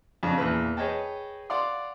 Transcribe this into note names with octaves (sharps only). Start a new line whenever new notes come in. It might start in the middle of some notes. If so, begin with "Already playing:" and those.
F2 C#3 D4
E2 A#2 B4
G#4 B4 C#5 D#5 G5 A5
D5 F5 F#5 C6 D6